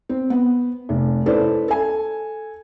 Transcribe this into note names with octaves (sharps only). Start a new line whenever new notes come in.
C4
B3
F1
C#4 E4 A4 B4 C5 D5
A4 G#5